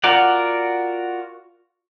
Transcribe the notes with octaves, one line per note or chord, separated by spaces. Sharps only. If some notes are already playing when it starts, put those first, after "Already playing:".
F4 F#4 A#4 D5 F#5